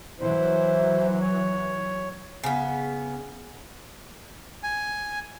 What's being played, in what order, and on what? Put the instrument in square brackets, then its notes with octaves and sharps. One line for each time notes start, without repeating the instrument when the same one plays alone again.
[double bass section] E3 F#3 [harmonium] E4 C5
[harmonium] C#5
[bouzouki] C#3 B3
[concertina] G#5